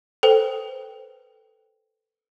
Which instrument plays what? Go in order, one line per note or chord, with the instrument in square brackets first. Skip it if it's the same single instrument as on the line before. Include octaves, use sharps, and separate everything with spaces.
[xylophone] A4 B4 C5 G5